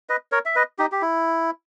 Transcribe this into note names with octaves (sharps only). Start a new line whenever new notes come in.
B4 D#5
A#4 C#5
E5
B4 D#5
D#4 G4
G4
E4